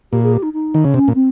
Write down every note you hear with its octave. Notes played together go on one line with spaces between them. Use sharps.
A#2 G4
G#4
G4
D#4
D#4
D#3
C#3
C3 C#4
A#2
C4